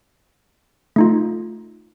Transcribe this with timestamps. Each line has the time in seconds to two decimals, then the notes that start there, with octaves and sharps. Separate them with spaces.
0.96 A3 D#4 F4